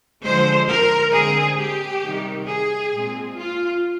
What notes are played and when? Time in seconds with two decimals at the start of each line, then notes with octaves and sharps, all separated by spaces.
0.23 D3 F3 G#3 C5
0.68 A#4
1.13 D3 G#3 C4 G#4
1.58 G4
2.03 C3 D#3 G3
2.48 G#4
2.92 A#2 G#3 C4
3.37 F4